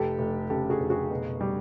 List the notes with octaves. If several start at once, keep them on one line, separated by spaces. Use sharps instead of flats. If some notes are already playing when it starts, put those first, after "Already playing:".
Already playing: F1 G4 A4
F1
C#3 G4 A4
F#4 G#4
F1
F#4 G#4
B2
G3